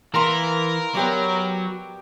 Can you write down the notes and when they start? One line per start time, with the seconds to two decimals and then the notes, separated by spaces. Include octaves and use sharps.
0.14 E3 A#3 A#4 C6
0.95 F#3 B3 G4 D5